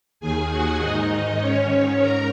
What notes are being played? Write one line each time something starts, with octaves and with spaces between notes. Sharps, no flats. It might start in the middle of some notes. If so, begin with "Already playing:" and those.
D#2 D#3 G#4 G#5
F#4 F#5
G#2 D#3 D#4 D#5
G#2 D#3 C#4 C#5
G#2 A#4 A#5